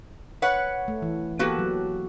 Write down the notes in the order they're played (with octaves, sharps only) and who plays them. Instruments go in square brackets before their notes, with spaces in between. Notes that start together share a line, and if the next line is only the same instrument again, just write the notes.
[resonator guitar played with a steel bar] B4 C#5 F#5
[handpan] A3
E3
[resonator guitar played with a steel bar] A#3 F#4 B4 [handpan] B3 G4 A4
[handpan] F#3